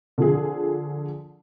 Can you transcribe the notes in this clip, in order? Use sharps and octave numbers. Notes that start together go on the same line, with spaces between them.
D3 F3 G#4